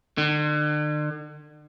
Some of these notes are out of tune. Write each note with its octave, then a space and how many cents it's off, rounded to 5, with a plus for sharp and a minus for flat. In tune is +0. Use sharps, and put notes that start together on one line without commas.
D3 +40